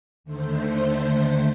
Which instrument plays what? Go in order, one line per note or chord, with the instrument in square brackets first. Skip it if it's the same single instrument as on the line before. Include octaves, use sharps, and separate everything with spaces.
[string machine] D#2 D3 A3 C5